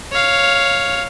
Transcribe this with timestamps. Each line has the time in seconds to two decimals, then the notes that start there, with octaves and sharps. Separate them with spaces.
0.12 C#5 F5